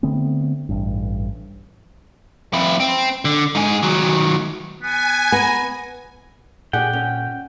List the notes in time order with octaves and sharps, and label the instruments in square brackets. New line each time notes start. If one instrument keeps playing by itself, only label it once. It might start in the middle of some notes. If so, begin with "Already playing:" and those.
[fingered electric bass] D3 A3 B3 C4
A1 G2
[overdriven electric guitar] F2 E4
C4
D3
G#2 G#4
D#3 F#3
[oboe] B3 [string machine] G#5
[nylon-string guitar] B3 [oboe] A#5
[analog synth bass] A#2 [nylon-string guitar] D4 G4 G#4 [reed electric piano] F#5 [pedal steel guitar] G5
[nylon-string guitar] C#4